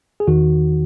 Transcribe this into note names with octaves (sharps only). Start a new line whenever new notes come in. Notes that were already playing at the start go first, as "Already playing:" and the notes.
G#4
E2 D#3 F#4